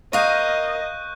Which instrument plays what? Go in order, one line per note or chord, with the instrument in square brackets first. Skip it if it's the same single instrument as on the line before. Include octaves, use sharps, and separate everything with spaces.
[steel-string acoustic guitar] A#4 F5 [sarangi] D#5 [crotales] C#6 F#6 G6